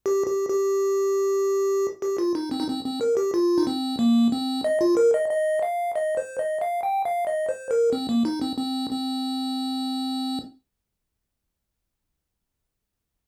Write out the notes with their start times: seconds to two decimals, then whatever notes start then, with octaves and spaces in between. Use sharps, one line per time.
0.06 G4
0.27 G4
0.49 G4
2.02 G4
2.18 F4
2.35 D#4
2.51 C4
2.60 D#4
2.68 C4
2.85 C4
3.01 A#4
3.17 G4
3.34 F4
3.58 D#4
3.67 C4
3.99 A#3
4.32 C4
4.64 D#5
4.81 F4
4.97 A#4
5.14 D#5
5.30 D#5
5.63 F5
5.95 D#5
6.17 C5
6.39 D#5
6.61 F5
6.83 G5
7.05 F5
7.27 D#5
7.49 C5
7.71 A#4
7.93 C4
8.09 A#3
8.25 D#4
8.41 C4
8.57 C4
8.91 C4